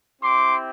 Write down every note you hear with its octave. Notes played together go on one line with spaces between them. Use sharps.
C4 E4 G4 C6 D6